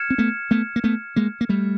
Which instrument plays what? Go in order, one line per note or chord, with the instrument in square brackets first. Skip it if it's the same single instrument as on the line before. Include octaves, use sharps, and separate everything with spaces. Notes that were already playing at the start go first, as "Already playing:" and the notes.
Already playing: [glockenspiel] F6 G#6 C#7 E7
[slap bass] C4
A3 B3
A3 B3
A#3
A3 B3
G#3 A#3
A#3
G3 A3